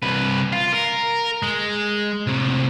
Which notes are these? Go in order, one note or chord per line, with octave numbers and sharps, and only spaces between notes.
C2 B4
F4
A#4
G#3
A2 C3